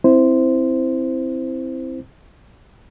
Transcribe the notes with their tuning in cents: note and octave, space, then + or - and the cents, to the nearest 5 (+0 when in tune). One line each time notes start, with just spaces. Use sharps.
C4 +0 E4 -5 C5 -10